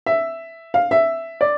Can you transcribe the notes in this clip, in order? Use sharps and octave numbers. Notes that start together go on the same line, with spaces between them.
E5
F5
E5
D5